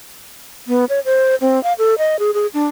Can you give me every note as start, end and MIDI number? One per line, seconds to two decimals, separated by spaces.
0.68 0.85 59
0.89 1.00 73
1.05 1.35 72
1.41 1.62 60
1.63 1.73 77
1.79 1.94 69
1.98 2.16 75
2.19 2.31 68
2.34 2.47 68
2.54 2.66 62